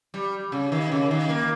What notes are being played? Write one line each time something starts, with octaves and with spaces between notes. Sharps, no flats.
G3
C#3
D#3
C#3
D#3
A#3